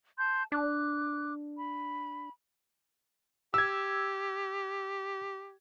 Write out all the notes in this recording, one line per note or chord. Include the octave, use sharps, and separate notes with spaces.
A5 C6 G6
D4 D6 F#6
B5
G4 E6 G#6